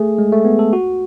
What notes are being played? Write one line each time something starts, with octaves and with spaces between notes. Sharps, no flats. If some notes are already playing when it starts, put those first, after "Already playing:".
Already playing: A3 G#4
G#3
A3
B3
A4
F#4